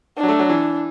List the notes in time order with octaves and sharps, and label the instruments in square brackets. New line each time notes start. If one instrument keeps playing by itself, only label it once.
[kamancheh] D4
[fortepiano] F#3
A3
F#3
E3